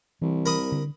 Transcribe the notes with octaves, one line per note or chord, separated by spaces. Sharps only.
C2 E3
A#4 B5 D#6
D3